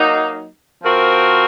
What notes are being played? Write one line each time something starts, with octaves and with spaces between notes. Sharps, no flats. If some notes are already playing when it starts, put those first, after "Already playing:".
Already playing: F#3 A#3 D#4
F3 C4 F#4 A#4